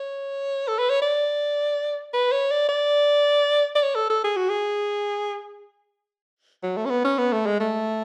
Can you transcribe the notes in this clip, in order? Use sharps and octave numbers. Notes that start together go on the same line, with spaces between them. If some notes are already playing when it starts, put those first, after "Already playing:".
Already playing: C#5
A4
B4
C#5
D5
B4
C#5
D5
D5
D5
C#5
A4
A4
G#4
F#4
G#4
F#3
A3
C#4
B3
C#4
B3
A3
G#3
A3